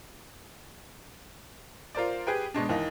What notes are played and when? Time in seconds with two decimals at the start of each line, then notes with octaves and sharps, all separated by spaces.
1.95 F4 A#4 C5 D5
2.27 G4 G#4 B4 G5
2.54 B2 G#3 D4
2.69 D#2 E3 A#3 D#4